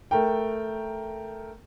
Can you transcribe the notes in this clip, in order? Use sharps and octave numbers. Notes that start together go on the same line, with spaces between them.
A3 A#4 G5